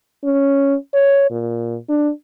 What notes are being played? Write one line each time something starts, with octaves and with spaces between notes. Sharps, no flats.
C#4
C#5
A#2
D4